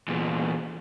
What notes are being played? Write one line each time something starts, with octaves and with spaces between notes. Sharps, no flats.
E2 A#2